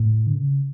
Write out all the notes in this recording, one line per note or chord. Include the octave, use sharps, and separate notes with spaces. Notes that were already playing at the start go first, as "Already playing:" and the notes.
Already playing: A2
D3
C#3